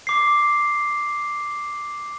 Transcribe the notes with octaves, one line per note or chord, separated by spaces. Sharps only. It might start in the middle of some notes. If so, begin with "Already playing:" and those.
D6 C7